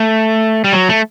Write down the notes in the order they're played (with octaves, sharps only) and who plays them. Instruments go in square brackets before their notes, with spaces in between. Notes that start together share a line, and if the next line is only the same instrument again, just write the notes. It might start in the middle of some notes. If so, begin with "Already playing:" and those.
Already playing: [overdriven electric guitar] A3
G3
F#3
A3